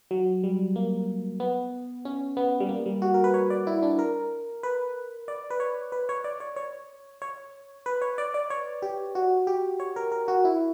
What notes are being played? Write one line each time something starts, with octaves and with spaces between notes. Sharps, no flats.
F#3
G3
A#3
B3
C#4
B3
G3
A#3
G3
F#4
A#4
B4
C#5
D5
E4
D4
A#4
B4
D5
B4
C#5
B4
C#5
D5
C#5
C#5
C#5
B4
C#5
D5
D5
C#5
G4
F#4
G4
C#5
A#4
A#4
F#4
E4